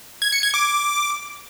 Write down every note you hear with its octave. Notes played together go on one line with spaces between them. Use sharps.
G#6
C#7
G#6
D6